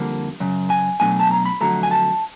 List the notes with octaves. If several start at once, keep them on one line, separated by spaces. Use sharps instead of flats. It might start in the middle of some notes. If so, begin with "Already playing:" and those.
Already playing: F2 D3 G3 A#3
F#2 C#3
G#5
B2 F#3 A3 D4 G#5
A5
A#5
B5
F2 D3 F#3 A3 A#5
G#5
A5